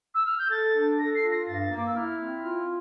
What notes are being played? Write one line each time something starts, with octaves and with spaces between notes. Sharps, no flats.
E6
F6
G6
A4 A6
D4
A4 A#6
C7
F4
A#6
G2 A6
A#3
D6
E6
E4 F6
C4
F4